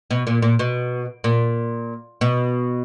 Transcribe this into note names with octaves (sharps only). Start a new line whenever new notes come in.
B2
A#2
A#2
B2
A#2
B2